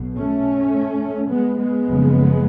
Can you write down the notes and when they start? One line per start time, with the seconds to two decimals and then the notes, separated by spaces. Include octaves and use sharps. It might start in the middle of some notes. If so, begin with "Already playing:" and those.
Already playing: B1 B2
0.17 A3 C#4
1.29 G#3 B3
1.58 G#3 B3
1.87 F#1 F2 C#3